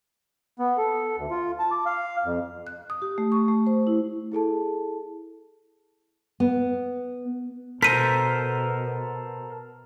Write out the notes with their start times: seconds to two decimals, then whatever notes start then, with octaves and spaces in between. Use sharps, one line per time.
0.59 B3
0.78 A4
1.17 D2
1.31 F4
1.59 A5
1.71 D6
1.86 F5
2.25 F2
2.67 F#6
2.90 D#6
3.02 G4
3.18 A3
3.32 C#6
3.48 A3
3.67 C5
3.87 E4
4.32 E4 G#4 A4 A5
6.40 B3
7.82 B2 A4 A#4 C5 B6 D#7